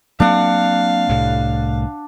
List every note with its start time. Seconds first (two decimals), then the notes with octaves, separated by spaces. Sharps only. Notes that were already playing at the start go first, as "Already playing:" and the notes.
0.20 F#3 A#3 C4 D4 F5 F#5
1.09 C2 A2